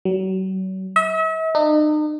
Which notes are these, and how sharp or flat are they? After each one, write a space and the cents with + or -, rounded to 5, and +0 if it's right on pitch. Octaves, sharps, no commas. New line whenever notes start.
F#3 +35
E5 -40
D#4 -40